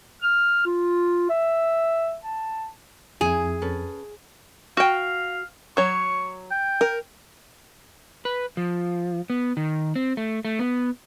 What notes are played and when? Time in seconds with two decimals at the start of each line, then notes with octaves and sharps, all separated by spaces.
0.22 F6
0.65 F4
1.29 E5
2.23 A5
3.21 F2 E4 G#4 G#5
3.62 C#4 A4 B4
4.77 F#4 F5 G5
5.77 F#3 C#5 C#6
6.51 G5
6.81 A#4
8.25 B4
8.57 F3
9.30 B3
9.57 D#3
9.95 C4
10.17 A3
10.45 A3
10.59 B3